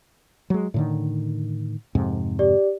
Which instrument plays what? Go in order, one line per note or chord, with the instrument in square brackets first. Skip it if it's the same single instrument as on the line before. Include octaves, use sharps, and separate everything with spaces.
[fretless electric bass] F#3 G#3
A2 D3 D#3
F2 G#2 C3
[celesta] G4 D5